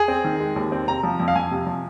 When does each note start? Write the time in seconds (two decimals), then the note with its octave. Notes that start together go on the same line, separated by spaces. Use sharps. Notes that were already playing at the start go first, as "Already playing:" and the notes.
Already playing: G#4
0.08 C4
0.24 D#3
0.40 G#3
0.56 D#2
0.72 C4
0.87 C3 A#5
1.03 F3
1.20 F2
1.28 F5
1.35 F2 G#5
1.51 C3
1.67 F3